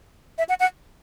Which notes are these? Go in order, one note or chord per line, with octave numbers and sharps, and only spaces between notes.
E5
F#5
F#5